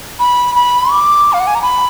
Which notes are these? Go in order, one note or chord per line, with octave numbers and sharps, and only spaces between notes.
B5
B5
D6
F5
F#5
G#5
A#5
B5